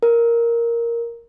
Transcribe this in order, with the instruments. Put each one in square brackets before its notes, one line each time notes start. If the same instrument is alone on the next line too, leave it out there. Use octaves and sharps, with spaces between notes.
[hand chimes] A#4